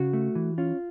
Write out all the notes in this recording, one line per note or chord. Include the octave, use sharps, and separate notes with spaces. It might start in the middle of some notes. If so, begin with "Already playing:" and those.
Already playing: C#3 F#4
A3
E3
C#4 F4